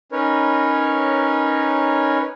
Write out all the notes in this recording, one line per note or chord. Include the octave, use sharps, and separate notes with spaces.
C#4 D#4 A#4 B4 C#5